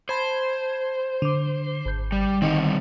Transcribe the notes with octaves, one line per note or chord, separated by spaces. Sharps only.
C5 A5 B5 G#6
D3 D6
G#1 G6
G3
D3 D#3 G3 C4 D#5 C#7